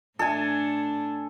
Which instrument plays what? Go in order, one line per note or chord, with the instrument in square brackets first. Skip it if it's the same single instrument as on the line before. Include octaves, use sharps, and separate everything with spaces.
[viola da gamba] A2 D4 [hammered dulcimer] A4 G#5